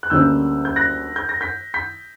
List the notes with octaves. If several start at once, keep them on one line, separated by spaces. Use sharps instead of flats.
F#6
D2 D3 G3 A#3 C#4 E6 G6
G6
F#6 A#6
G6
A#6
G6 B6
G6 B6